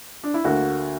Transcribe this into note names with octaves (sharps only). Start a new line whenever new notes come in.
D4
E4
D2 D3 A#3 F#4